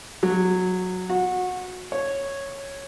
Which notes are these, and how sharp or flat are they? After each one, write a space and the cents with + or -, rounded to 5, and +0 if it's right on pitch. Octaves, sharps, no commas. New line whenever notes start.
F#3 -10
F#4 -20
C#5 -5